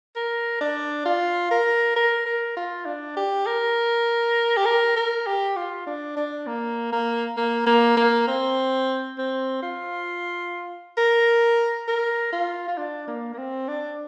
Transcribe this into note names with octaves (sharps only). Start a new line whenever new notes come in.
A#4
D4
F4
A#4
A#4
A#4
F4
D4
G4
A#4
G4
A#4
A#4
G4
F4
D4
D4
A#3
A#3
A#3
A#3
A#3
C4
C4
F4
A#4
A#4
F4
F4
D4
A#3
A#3
C4
D4